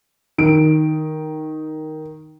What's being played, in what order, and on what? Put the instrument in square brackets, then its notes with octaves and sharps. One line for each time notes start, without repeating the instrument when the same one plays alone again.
[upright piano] D#3 D7